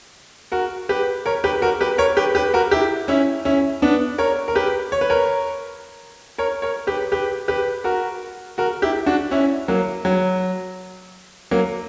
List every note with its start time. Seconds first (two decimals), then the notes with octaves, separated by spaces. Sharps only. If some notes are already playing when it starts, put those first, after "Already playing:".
0.52 F#4 A#4
0.89 G4 B4
1.26 A#4 C#5
1.44 G4 B4
1.62 F#4 A#4
1.81 G4 B4
1.98 A#4 C#5
2.17 G4 B4
2.35 G4 B4
2.54 F#4 A#4
2.71 E4 G4
3.08 C#4 E4
3.45 C#4 E4
3.82 B3 D4
4.18 A#4 C#5
4.48 A#4
4.55 G4 B4
4.92 C#5
5.01 B4
5.10 A#4 C#5
6.38 A#4 C#5
6.62 A#4 C#5
6.87 G4 B4
7.12 G4 B4
7.48 G4 B4
7.84 F#4 A#4
8.58 F#4 A#4
8.82 E4 G4
9.06 D4 F#4
9.31 C#4 E4
9.68 F#3 A#3
10.05 F#3
11.51 F#3 A#3